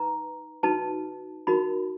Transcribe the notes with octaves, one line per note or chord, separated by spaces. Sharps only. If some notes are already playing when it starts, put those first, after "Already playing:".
Already playing: D#4 B4 A#5
D#4 F#4 B4 A5
D#4 F#4 A#4 B5